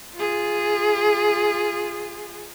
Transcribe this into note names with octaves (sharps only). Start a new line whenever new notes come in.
F4 G#4